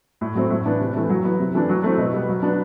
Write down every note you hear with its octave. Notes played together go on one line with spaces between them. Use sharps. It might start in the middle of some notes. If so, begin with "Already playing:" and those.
A2
F#3 A3 C4
A2
E3 B3 D4
C3
E3 A3 E4
F#3
B3 E4
C3
E3 A3 D4
F#3
A3 C4 E4
B2
G3 B3
F#3
B3 D4